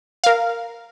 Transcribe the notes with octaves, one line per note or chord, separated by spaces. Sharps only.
A#4 F5